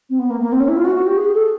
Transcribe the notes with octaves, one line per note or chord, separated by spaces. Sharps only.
C4
B3
A#3
A#3
C4
C#4
E4
F4
F#4
F#4
G4
G#4
A4